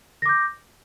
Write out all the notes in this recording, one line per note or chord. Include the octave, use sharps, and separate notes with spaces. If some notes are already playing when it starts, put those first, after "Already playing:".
D6 G6 A#6